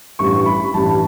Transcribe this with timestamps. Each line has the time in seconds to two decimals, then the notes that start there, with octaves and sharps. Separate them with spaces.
0.19 A1 G2 E3 G3 C#6
0.46 B5
0.74 A1 G2 E3 G3 A5